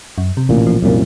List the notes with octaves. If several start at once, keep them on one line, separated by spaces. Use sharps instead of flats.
F#2
C3
A1 A#2
F3
C2 F#2 A#2